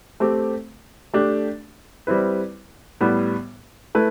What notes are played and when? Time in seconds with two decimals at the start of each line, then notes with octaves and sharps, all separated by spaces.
0.20 A3 C4 G4
1.13 A3 D4 G4
2.07 G3 C4 E4 B4
3.01 A2 G3 B3
3.95 A3 E4 B4